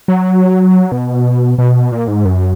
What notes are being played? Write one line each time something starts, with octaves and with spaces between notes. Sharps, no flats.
F#3
B2
B2
A#2
G#2
F#2